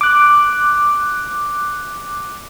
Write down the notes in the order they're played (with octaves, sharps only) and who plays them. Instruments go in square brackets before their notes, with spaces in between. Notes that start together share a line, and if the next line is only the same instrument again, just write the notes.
[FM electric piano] D6 F#6